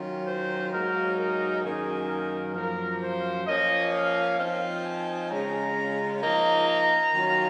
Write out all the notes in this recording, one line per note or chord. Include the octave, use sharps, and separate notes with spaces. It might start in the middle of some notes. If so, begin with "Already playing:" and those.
Already playing: D#3 F#3 C#4 F4
C5
G#2 F#3 A#3 D#4 A#4
A#4
F#2 D#3 A#3 D#4 G#4
A#4
F#2 F3 A#3 A#4
C5
F3 A#3 C#4 D#5
F5
F3 C4 D#4 F5
G#5
C#3 G#3 C#4 F4 A#5
F3 A#3 D#4 A#5
A#5
D#3 F#3 C#4 F4